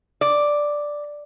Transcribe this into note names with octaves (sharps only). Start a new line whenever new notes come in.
D5